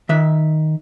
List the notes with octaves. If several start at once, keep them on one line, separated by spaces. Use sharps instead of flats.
D#3 E5